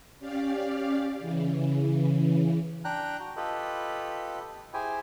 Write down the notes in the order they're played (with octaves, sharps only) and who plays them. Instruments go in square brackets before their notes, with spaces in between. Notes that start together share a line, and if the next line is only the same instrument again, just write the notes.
[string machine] C#4 G4 D5 F5
C#3 E3
[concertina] D4 G5 A#5 F#6
F#4
F4 G4 A4 B4 D#5 B5
E4 G4 G#4 C5 G5 G#5